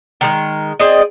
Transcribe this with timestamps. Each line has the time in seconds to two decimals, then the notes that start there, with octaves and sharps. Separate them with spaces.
0.21 D#3 G3 G#3
0.80 C4 G#4 D5 D#5